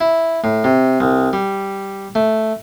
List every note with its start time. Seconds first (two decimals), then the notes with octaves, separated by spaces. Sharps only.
0.01 E4
0.44 A2
0.64 C3
1.00 C2
1.33 G3
2.15 A3